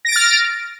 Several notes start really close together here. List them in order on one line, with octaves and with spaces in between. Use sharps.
A#6 D7 A6 F6